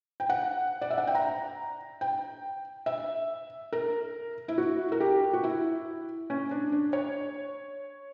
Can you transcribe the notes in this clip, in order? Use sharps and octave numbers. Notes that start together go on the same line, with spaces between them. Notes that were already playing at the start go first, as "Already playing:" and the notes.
G5
F#5
D5
E5
F#5
G5
A#5
G5
E5
A#4
E4
F#4
A#4
G4
F#4
E4
C#4
D4
D4
C#5